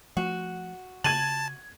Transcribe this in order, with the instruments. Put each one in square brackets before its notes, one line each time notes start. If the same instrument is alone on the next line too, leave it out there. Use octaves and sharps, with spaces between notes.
[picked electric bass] F3 A3 [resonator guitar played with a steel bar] F#4
[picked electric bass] C#3 [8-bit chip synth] A5 [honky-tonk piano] G#6 D#7 F#7